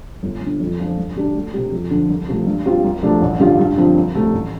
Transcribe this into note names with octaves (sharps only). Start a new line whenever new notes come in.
G1
G2 D3
F2
F3 D4 F4
G2
D3 G3 D4
D2
C3 G3
F2
D3 F3
C2
C3 F3 A3
G2
G3 C4 F4
C2
C3 F3 A3 D4
A1
G2 D3 G3 F4
G2
D3 F3 C4 F4
C2
C3 A3
A1